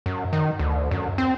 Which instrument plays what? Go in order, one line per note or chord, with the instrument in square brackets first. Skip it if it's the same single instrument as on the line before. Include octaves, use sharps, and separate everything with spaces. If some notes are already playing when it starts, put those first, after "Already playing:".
[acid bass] F#2
D#3
D2
F#2
C4